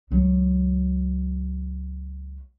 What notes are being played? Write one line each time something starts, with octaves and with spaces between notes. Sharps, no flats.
C#2 F#3